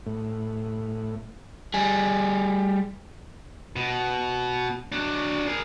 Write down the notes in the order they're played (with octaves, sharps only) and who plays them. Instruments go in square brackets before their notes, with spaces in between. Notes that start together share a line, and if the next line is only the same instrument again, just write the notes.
[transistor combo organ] A2
[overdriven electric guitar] G3 G#4
[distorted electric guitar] B2
F#3 D4
G#4 A#4